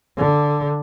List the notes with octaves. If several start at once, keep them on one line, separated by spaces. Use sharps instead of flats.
D3